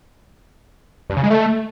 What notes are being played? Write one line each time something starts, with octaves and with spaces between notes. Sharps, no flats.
G2
C#3
G#3
A3